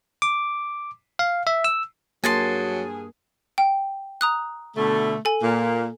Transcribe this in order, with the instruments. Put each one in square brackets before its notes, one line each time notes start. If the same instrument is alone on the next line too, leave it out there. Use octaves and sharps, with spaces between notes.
[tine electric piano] D6
F5
E5
E6
[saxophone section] G2 G#4 [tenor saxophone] F#3 [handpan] A#3 [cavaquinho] G#5 A5 C6
[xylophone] G5
A#5 D#6 F#6
[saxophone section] B2 D3 A3
[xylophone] A4 G#5
[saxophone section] A#2 A#3